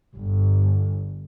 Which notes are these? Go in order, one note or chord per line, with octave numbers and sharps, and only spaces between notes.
G1